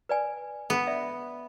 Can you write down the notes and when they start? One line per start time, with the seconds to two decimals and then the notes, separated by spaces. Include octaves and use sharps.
0.09 B4 D5 G#5
0.70 B3
0.87 D5 E5